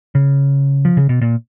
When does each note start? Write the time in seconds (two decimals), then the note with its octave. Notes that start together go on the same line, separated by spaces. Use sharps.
0.15 C#3
0.85 F3
0.97 C#3
1.09 B2
1.21 A#2